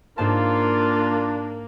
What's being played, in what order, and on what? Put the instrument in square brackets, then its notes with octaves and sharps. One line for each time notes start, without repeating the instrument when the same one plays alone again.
[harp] G#2 C5 A5 [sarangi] A#3 [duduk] D4 [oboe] F4